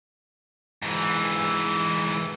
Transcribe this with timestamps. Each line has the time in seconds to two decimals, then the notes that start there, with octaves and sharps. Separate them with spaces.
0.82 G#2 E3